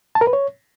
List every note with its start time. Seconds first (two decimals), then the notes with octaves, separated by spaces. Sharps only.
0.15 A5
0.21 A#4
0.27 B4
0.33 C#5